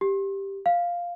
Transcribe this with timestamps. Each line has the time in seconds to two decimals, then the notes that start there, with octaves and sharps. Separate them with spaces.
0.01 G4
0.66 F5